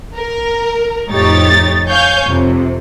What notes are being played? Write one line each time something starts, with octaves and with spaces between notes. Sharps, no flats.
A#4
F2 A2 D#4 G4 C#5 A6
C#5 F5 G#5 G6
F2 C3